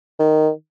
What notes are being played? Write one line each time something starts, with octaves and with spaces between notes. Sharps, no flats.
D#3